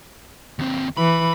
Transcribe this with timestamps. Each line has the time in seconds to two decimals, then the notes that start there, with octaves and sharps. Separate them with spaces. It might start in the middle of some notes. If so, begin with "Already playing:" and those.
0.59 D#2 C4
0.97 E3 B5